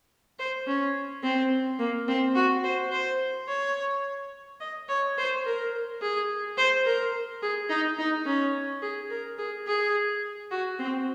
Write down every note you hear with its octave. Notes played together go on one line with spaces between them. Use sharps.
C5
C#4
C4
A#3
C4
F#4
C5
C5
C#5
D#5
C#5
C5
A#4
G#4
C5
A#4
G#4
D#4
D#4
C#4
G#4
A#4
G#4
G#4
F#4
C4